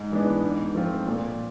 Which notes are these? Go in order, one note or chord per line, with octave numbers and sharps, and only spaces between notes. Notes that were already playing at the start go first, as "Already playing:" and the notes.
Already playing: G#2
E3 G#3 B3 D4
G#2
F3 A3 C4 F4
A#2